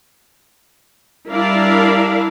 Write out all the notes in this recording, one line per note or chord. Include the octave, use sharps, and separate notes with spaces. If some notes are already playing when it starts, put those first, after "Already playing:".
G3 D4 E4 A#4 D5 F5